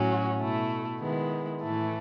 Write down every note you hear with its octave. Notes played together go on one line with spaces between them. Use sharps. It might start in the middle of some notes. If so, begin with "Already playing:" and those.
Already playing: A2 F#3 C#4 F#4
B2 A3 E4
D#3 G#3 B3 E4
A2 E3 A3 E4